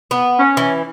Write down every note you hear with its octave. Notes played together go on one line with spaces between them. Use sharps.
B3
C#4
E3